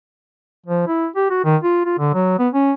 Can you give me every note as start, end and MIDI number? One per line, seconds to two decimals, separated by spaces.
0.67 0.87 53
0.88 1.07 64
1.16 1.30 67
1.31 1.40 66
1.45 1.57 51
1.64 1.84 65
1.86 1.94 65
1.99 2.11 50
2.14 2.36 54
2.39 2.49 59
2.54 2.73 61